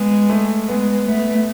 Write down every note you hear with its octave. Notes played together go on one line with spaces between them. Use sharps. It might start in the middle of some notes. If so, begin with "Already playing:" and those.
Already playing: G#3 B3
A3
G#3 B3
A3 B3